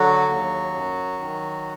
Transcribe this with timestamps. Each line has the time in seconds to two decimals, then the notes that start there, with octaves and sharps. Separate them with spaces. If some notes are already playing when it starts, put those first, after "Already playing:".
Already playing: D3 F#3 F#4
0.28 D#2
0.73 F#2
1.19 D#3